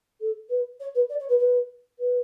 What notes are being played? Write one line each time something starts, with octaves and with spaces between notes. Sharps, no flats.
A4
B4
C#5
B4
D5
C#5
B4
B4
B4